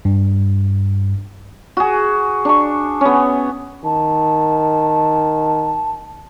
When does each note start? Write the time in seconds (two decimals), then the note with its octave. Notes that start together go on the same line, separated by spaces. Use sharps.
0.05 G2
1.77 F#4 G#4
2.45 D4 C#6
3.01 B3 C#4
3.85 D#3 A5